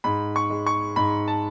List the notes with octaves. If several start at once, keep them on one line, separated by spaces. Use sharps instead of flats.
G#2 B5
C#6
G#3
C#6
G#2 B5
A5